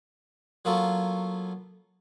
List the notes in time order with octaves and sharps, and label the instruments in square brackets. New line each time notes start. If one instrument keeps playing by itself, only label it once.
[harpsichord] F#3 A#3 B3 F4 A4 C#5